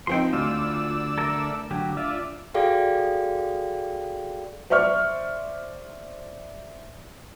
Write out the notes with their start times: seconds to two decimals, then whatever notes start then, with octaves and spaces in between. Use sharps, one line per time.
0.07 F3 C4 D#4 G5 C6
0.33 D2 D3 F4 D5 E6
1.18 A4 A#4 E5
1.71 D3 F#3 G4
1.97 D4 F4 D5 E5
2.54 F#4 G#4 A4 D5 F5 G5
4.70 C5 D5 E5 C#6 F6